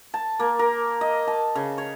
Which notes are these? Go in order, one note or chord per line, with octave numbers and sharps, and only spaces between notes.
A5
A#3
A#4
D#5
A5
C#3
C#5